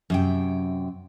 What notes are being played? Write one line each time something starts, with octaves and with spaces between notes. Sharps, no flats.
F#2 C3 G5